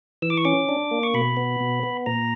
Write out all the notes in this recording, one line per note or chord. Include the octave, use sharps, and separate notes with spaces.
E3 E6
D6
C#6
C#4 D6
D4
A#3
C#6
B2 B5
B3
B2
B3
A#2 A#5